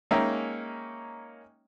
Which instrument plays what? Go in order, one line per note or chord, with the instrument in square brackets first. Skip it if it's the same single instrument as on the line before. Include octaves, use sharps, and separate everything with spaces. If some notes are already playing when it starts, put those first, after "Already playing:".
[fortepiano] G#3 A#3 C#4 D#4 E5 G5